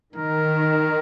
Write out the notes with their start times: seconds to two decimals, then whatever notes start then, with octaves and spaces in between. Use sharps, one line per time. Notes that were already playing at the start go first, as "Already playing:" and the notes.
0.15 D#3 A#4